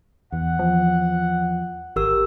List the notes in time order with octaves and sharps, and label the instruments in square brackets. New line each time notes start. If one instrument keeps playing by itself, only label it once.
[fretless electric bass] E2 E3 [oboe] F#5
[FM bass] F3
[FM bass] G#1 [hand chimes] G4 A#4 E6